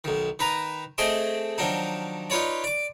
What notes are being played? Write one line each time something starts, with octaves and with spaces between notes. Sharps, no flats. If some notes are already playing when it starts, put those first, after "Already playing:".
B1 D#3
D#3 B4 A#5 D#6
A3 C4 G#4 D#5 C6 D6
D#3 F3 F#3 D4 D#4
D#4 F4 B4 C#5 D5
D5 D6